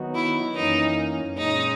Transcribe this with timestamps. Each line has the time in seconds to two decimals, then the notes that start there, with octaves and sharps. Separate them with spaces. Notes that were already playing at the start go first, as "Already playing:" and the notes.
Already playing: D#3 F#3 B3 D#4 F#4
0.15 E4
0.55 F#2 E3 A#3 C#4 D#4
1.38 A#2 G#3 C#4 D#4